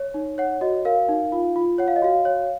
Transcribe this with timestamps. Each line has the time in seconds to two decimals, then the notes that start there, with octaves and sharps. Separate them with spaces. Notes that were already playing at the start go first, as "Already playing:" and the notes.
Already playing: C#5
0.14 D#4
0.38 C#5 F#5
0.61 F#4 D#5
0.85 A#4 F5
1.09 D#4
1.32 F4
1.56 F4
1.78 C#5 F#5
1.88 F5
1.96 D#5
2.02 F#4 F5
2.25 C#5